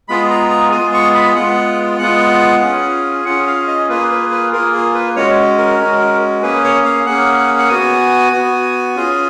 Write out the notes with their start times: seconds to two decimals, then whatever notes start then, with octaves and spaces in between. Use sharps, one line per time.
0.08 G#3 B3 F4 G#4 B5
0.30 A#5
0.51 A#5
0.72 G#3 B3 F4 G#4 G#5
0.94 C#6
1.15 B5
1.35 G#3 B3 F4 F#5
1.99 G#3 B3 F4 F#5
2.62 C#4 F4 G#4
3.25 C#4 F4 G#4 F#5
3.47 F5
3.67 D#5
3.89 A#3 F4 G#4 B4
4.11 B4
4.31 B4
4.53 A#3 F4 G#4 A#4
4.74 G#4
4.94 B4
5.16 G#3 C#4 F#4 C#5
5.58 A#4
5.79 G#3 C#4 F#4
6.42 A#3 C#4 G#4 B4
6.64 C#5
6.85 F5
7.06 A#3 C#4 G#4 F#5
7.58 F#5
7.69 B3 F#4 G#5
8.32 B3 F#4
8.96 C#4 F4 G#4